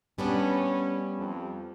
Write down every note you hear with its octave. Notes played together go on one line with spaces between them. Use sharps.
G3 B3 C#4 D4
F2